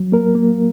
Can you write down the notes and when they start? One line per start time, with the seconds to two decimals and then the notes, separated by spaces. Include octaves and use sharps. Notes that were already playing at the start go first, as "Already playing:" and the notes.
Already playing: F#3
0.12 A#3 A#4
0.35 A#3